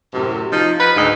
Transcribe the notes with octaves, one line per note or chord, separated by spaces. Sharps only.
F#2 A2 C3
F3 D#4
B4
D2 G#2 D#4